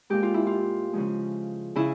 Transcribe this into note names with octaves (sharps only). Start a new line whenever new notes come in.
A#2 G#3 G4
F4
E4
F4
C#3 F3 G#3
C#3 E4